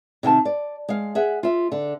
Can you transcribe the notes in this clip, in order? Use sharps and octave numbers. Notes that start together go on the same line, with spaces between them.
C3 D#3 G5 A5
D5
G#3 F5
G#4 E5 F#5
F4 E5
D3